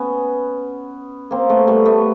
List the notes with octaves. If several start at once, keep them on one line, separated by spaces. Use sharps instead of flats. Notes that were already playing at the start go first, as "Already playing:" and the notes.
Already playing: B3 C#4
A#3 C4
A3 B3
G3 A3
A3 B3